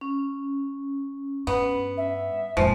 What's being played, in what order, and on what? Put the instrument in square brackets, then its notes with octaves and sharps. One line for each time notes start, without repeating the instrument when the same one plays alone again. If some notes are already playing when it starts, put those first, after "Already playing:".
[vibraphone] C#4
[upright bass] G2 [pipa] B3
[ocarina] E5
[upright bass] F2 A#2 [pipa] F3 [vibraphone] G#3